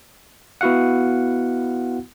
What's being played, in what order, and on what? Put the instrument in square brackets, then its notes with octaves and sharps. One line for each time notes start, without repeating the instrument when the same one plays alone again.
[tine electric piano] B3 E4 F#4 F5 F#5